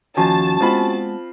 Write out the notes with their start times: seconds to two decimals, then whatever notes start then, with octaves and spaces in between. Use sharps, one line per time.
0.17 D#2 F3 C#4 F#4 A5 A#5
0.61 G#3 B3 C4 F4 B5